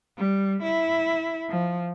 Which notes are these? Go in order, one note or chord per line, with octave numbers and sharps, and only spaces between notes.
G3
E4
F3